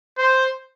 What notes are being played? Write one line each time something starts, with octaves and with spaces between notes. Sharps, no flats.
C5